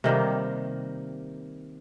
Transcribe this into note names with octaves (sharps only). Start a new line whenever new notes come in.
C3 D#3 G3 A#3